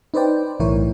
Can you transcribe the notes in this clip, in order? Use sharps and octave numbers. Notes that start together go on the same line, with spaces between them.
D#4 B4 C5 D5 G5
B1 A2 E3 E4 A#4 C#5